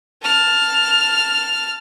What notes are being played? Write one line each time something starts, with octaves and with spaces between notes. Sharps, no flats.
A5 F6